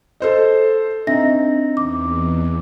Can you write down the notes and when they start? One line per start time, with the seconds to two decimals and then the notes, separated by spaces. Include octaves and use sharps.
0.20 A4 C5 D#5
1.07 C4 D4 D#4 E5 A#6
1.77 E2 D6